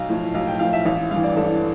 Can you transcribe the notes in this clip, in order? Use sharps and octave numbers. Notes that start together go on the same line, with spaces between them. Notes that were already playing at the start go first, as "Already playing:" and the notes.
Already playing: B1 F5
A2 F3
B1 F5
G5
A2 F3 F5
E5
A1 F5
G2 E3 F5
D5
A1 A4